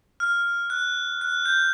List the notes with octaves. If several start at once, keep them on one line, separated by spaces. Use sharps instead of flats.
F6
F#6
F#6
G6